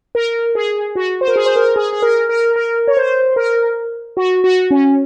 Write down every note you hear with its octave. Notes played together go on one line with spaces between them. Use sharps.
A#4
G#4
F#4
C5
A#4
G#4
C5
A#4
G#4
G#4
A#4
A#4
A#4
C#5
C5
A#4
F#4
F#4
C#4